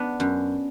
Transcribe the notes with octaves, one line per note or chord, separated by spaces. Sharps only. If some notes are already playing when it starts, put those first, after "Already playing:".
Already playing: B3 D4
F#2